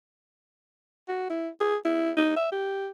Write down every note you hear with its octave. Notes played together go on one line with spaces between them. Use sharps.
F#4
E4
G#4
E4
D#4
E5
G4